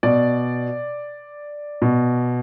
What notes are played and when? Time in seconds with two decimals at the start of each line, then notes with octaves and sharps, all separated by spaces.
0.03 B2 D5
1.82 B2